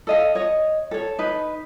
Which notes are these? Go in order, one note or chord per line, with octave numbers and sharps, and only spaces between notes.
A4 D#5 F5
C#5 D#5
A4 C#5
D#4 B4